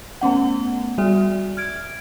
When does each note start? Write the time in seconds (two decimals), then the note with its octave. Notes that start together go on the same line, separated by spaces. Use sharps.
0.21 A3 B3 C#4 F#5
0.98 G3 F#4 D5 E5
1.57 F6 G#6 D7